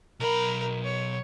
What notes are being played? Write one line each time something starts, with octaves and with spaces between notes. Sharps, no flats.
B1 A#4 B5
C#5